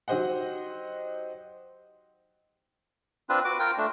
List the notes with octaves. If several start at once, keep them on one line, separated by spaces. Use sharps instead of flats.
F#3 D#4 G4 C5 D#5 F#5
C4 D4 F4 B4
F#4 B4 D6
F4 A#4 G5
A3 D4